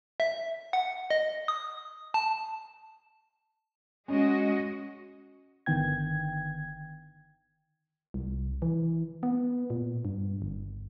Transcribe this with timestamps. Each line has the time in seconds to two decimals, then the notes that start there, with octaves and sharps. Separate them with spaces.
0.20 E5
0.73 F#5
1.10 D#5
1.48 D#6
2.14 A5
4.08 G#3 C#4 F#4 D#5
5.66 G1 D3 D#3 B3 G5 G#6
8.14 C2
8.62 E3
9.23 B3
9.70 A#2
10.05 G2
10.42 G1